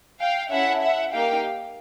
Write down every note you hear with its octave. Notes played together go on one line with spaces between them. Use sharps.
F5 G5
C#4 E4 A4 E5 F#5
E5 F#5
A#3 D#4 G4 F5 G5